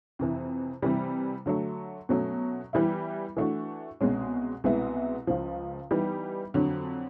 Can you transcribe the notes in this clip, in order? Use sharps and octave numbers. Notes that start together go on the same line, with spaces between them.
F2 C3 E3
C3 E3 G3
D3 F#3 A3
B2 F#3 A3 C#4
E3 G3 B3 E4
E3 A3 D4 F#4
C2 B2 G#3 C#4
C2 B2 G#3 B3 E4
C#2 C#3 F3
E3 G3 B3 D#4
F2 D3 F#3